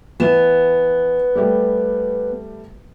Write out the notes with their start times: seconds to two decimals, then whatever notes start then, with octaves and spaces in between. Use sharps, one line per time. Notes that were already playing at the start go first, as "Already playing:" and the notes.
0.20 E3 B3 E7
1.35 G3 A3 G4